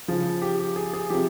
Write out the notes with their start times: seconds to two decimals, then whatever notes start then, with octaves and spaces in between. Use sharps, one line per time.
0.08 C#3 F3 G#4
0.42 G4
0.60 G4
0.76 G#4
0.94 G#4
1.10 C3 F3 G4